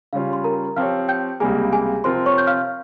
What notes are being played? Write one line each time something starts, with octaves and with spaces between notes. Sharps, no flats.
C#3 G3 C#4 F4 F5
C6
A#4 A#5
F3 C4 G4 C#5 F5 F6
G5 G6
C#2 C3 G3 A#3 G#4 G#5
G#4 G#5
C3 F3 C4 F4 A#4 C5 C6
C#5 C#6
G6
F5 F6